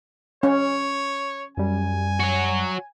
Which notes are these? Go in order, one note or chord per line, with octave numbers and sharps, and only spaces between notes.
C#4 C#5
F#2 G3 G#5
F#4 C#5